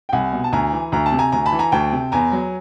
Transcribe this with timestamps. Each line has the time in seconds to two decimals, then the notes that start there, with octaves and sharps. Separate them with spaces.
0.09 G5
0.13 C2 F#5 G#5
0.33 B2
0.44 A5
0.52 D2 G#5 A#5
0.72 E3
0.92 D2 A#5
1.06 A5
1.12 C3
1.19 G#5 A#5
1.32 D2 G#5 A#5
1.46 A5 B5
1.52 E3
1.59 G#5 A#5
1.72 D2 G5 A5
1.92 C3
2.12 E2 G#5 A#5
2.32 F#3